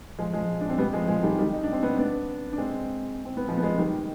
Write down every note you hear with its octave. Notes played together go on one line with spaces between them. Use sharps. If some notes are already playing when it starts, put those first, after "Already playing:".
F3 G#3
F3 G#3
D4
C4
G3 B3
F3 G#3
F3 G#3
D#3 G3
D#3 G3
D#4
D4
C4
B3 D4
B3 D4
D4
G#3 C4
C4
B3
F3 G#3
B3
F3 G#3
D#3 G3